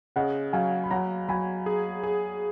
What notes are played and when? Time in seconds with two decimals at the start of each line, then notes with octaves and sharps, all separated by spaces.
0.16 C#3 D#5 F#5
0.53 F#3 F5 G#5
0.84 B5
0.91 F#3 F#5 A#5
1.28 F#3 G#5 B5
1.66 G#4
2.03 G#4